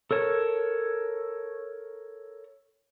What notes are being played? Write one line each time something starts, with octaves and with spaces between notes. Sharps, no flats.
A4 A#4 C#5 A5